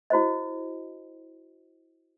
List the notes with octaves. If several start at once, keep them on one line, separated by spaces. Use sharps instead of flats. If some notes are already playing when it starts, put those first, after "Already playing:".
E4 F#4 C5 D#5